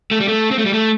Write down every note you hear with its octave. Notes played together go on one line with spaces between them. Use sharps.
A3
G3
A3
C4
A3
G3
A3